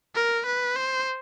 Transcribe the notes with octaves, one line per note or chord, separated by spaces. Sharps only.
A#4
B4
C5